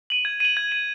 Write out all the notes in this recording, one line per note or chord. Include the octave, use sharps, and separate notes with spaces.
D#7 F#7
G#6
D#7 F#7
G#6
D#7 F#7